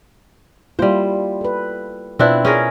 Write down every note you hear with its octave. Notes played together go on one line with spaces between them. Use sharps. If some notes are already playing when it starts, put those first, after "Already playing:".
G3 A#3 E4 F4 C5
A4 B4
B2 C4 D4 E4 F4 B4
C#4 G#4 A#4